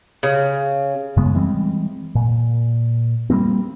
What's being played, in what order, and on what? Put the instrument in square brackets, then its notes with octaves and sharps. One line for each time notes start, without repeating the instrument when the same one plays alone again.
[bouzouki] C#3
[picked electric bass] F#2 C#3 G#3 B3
E3 G3 G#3 C4
A#2
G3 G#3 A#3 C4